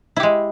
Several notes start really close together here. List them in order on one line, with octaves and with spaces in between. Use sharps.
E4 G4 G#3